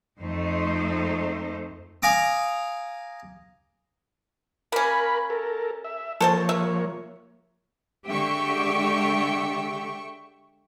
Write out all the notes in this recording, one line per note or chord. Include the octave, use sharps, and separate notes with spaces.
F2 A3 D#4 C5
F5 G#5 A#5 D6 D#6
A#3 C#4 A#4 B5
A4 A#4
E5
F3 A#3 A4 C5 C#5 A5
E5
D3 G#3 G4 E5 G5 C#6